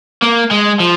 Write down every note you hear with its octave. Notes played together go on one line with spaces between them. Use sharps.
A#3
G#3
F3